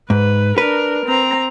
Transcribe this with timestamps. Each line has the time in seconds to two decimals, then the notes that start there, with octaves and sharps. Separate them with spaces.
0.10 G#2 B4
0.58 D4 A#4 B4
1.06 C4 A#5